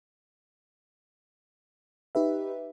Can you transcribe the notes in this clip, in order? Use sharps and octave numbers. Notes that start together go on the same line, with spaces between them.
D#4 G4 B4 E5